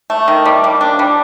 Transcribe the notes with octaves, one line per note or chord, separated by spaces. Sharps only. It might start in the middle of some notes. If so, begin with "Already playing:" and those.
A3
D#3
G3
A#3
D4
G3